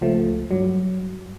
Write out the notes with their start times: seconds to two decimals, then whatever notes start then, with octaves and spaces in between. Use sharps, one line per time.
0.01 C#2 F3 A3
0.51 G2 F#3